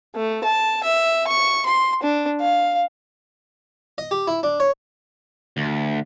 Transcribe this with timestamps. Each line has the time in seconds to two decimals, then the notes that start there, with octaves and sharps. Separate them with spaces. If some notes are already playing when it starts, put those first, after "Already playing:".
0.15 A3
0.44 A5
0.84 E5
1.27 C#6
1.66 C6
2.03 D4
2.41 F5
3.98 D#5
4.11 G4
4.28 E4
4.43 D4
4.60 C#5
5.57 D2